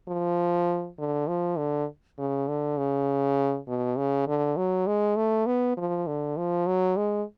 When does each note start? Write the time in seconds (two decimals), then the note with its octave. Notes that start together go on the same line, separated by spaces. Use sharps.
0.08 F3
0.99 D3
1.28 F3
1.58 D3
2.18 C#3
2.48 D3
2.78 C#3
3.68 B2
3.98 C#3
4.28 D3
4.57 F#3
4.87 G#3
5.17 A3
5.47 B3
5.77 F3
6.07 D3
6.37 F3
6.67 F#3
6.97 G#3